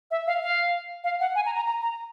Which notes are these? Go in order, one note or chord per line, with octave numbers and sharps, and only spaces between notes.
E5
F5
F5
F5
F#5
G#5
A#5
A#5
A#5
A#5